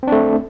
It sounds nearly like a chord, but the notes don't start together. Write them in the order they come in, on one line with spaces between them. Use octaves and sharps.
C4 D4 A3